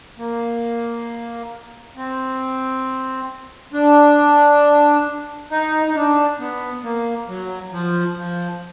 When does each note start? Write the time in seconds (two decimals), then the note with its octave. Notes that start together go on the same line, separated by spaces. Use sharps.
0.18 A#3
1.96 C4
3.73 D4
5.51 D#4
5.87 D#4
5.95 D4
6.39 B3
6.83 A#3
7.28 F#3
7.73 F3
8.17 F3